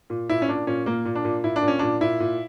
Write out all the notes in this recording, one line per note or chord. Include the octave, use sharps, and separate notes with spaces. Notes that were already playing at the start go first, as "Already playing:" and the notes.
A#2
A#2 E4
C#4
A#2 D4
A#2 C#4
A#2 A#3
A#2
D4
A#2
A#2 E4
D4
A#2
C#4
A#2 D4
A#2 E4
A#2